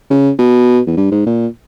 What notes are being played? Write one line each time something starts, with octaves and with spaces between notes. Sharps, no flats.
C#3
B2
E2
G2
G#2
A#2